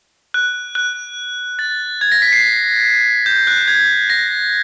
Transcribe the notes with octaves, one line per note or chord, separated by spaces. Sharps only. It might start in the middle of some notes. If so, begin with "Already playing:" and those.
F#6
F#6
A6
G#6
A#6
B6
C7
G6
F#6
G6
G#6
A#6